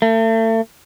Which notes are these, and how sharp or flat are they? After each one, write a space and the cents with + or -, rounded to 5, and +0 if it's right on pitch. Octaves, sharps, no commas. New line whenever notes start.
A3 +35